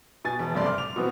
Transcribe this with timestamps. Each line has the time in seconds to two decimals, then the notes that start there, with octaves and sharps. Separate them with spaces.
0.25 B2 G#5 A6
0.39 E1
0.54 F#1 G2 C3 A3 D5 C6
0.66 D6 F6
0.78 F7
0.96 B2 E3 F#3 B3 C4